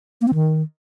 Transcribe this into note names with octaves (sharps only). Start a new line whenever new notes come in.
A#3
C4
D#3